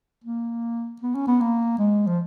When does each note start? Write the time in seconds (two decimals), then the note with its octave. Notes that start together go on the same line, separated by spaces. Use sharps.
0.24 A#3
1.02 B3
1.15 C#4
1.27 B3
1.40 A#3
1.78 G#3
2.07 F3